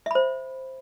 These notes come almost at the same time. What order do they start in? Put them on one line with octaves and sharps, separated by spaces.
E5 B5 C5